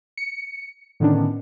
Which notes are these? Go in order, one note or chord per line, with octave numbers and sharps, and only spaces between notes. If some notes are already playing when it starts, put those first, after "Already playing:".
C#7
A2 D3 D#3 B3 C#4 D4